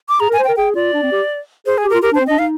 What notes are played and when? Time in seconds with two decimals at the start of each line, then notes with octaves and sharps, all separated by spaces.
0.09 D6
0.20 G#4 A#5
0.30 A#4 G#5
0.39 C5
0.44 G5
0.48 A#4
0.56 G#4 G5
0.75 F4 D5
0.93 D4
1.03 C4
1.12 G4
1.66 G#4 C5
1.78 G#4
1.84 G4
1.90 A#4
1.94 F4
2.02 G4 A#4
2.12 D4 C5
2.21 C4
2.27 D4 D#5
2.39 D#4 F5